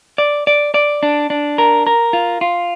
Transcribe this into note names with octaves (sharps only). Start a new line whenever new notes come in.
D5
D5
D5
D4
D4
A#4
A#4
F4
F4